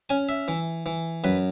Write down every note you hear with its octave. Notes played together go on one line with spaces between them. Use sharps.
C#4 G#5
E5
E3
E3
F#2 B4